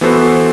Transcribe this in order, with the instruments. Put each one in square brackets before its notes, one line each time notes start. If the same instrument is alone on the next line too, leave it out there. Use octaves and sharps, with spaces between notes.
[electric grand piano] E3 B3 F#4 A4 C5